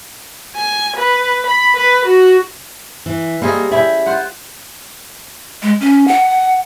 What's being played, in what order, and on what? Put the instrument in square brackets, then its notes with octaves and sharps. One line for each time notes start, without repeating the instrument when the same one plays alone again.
[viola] G#5
B4
B5
B4
F#4
[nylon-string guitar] E3
[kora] G3 C4 G#4 [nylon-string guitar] A#3 A4 D#5
[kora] C#4 E4 G4 [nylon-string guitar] D5 E5
[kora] F4 C5 F#5
[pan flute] G#3
C#4
F#5